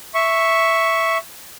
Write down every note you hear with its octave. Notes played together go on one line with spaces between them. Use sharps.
E5 C#6